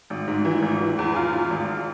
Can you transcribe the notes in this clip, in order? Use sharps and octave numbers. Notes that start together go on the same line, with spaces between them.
G#1
G#2
E3
G#1
E3
E2
F4
F4
G#1